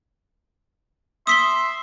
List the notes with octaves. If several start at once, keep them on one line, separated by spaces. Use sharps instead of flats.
E5 C6 D#6 B6 G7